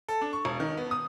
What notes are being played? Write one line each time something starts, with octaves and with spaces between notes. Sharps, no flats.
A4
D4
C#6
E1
D#3
B3
D#6